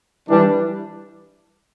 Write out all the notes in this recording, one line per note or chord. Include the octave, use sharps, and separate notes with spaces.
E3 G3 D4